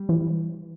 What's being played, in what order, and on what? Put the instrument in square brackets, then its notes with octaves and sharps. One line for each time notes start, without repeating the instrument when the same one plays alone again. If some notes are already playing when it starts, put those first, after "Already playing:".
Already playing: [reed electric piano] G3
[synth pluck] E3